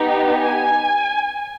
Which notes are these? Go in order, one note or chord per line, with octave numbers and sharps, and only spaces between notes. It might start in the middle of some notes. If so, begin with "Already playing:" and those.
Already playing: B3 D#4 G4
G#5